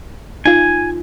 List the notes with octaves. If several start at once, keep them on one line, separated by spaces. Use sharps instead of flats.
D#4 F4 G#5